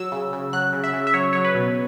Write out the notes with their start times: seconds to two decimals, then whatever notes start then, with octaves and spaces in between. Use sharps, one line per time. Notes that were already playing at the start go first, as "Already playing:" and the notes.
Already playing: F#3 E6
0.12 C#3
0.33 C#3
0.53 F#3 F#6
0.73 C#3
0.84 E5
0.93 C#3
1.07 E5
1.14 F#3 C#5
1.33 F#3 C#5
1.45 B4
1.55 B2